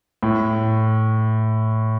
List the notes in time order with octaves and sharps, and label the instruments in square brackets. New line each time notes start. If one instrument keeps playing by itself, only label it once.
[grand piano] A2